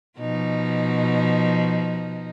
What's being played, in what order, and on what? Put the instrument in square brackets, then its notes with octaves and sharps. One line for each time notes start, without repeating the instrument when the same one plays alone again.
[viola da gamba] B2 F3 D#4